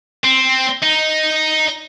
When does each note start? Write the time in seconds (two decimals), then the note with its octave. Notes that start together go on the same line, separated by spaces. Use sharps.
0.24 C4
0.83 D#4